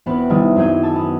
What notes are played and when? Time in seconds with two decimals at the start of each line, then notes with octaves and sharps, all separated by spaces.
0.06 E1 B3 C4 B4
0.30 C2 C3 D#3 G3 E4 D#6
0.56 F#2 F#3 C4 G#4 G6 D#7
0.83 A4 G#5 A5
0.96 B3 D#6